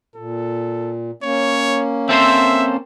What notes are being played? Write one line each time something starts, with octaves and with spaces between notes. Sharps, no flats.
A#2 A4
A#3 C#4 C#5
C4 A4 C5 E5